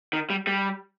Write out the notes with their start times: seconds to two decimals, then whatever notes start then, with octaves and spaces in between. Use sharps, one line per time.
0.13 D#3
0.30 G3
0.47 G3